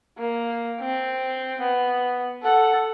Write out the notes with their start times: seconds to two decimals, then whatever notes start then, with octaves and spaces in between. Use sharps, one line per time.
0.18 A#3
0.80 C4
1.61 B3
2.43 A4 F#5